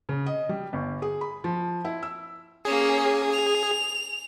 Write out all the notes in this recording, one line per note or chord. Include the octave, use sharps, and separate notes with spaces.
C#3
D#5
G3
G1
G#4
B5
F3
E4
E6
A#3 C#4 G#4
F7